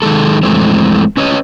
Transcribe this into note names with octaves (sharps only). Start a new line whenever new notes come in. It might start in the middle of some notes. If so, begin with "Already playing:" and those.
D#3 E3 G#3 A4
F2 E3 G#3 A3 C4
C#4 B4 C#5 D#5